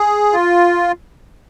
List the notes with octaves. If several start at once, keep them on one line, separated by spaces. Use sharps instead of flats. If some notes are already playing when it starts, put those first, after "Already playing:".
Already playing: G#4
F4